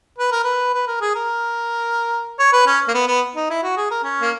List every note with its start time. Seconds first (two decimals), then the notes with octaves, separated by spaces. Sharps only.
0.18 B4
0.32 A#4
0.44 B4
0.74 B4
0.87 A#4
1.01 G#4
1.15 A#4
2.39 C#5
2.53 B4
2.67 C#4
2.88 A#3
2.94 B3
3.08 B3
3.35 D#4
3.50 E4
3.63 F#4
3.77 G#4
3.91 A#4
4.04 C#4
4.22 A#3